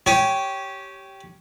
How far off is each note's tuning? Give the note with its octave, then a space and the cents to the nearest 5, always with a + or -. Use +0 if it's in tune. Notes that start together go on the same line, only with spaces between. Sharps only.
G4 -10 C#5 +0 G#5 +10